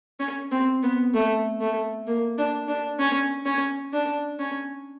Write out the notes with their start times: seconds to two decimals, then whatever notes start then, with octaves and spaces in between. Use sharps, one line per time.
0.20 C#4
0.52 C4
0.83 B3
1.14 A3
1.61 A3
2.07 A#3
2.38 D4
2.68 D4
3.00 C#4
3.46 C#4
3.93 D4
4.39 C#4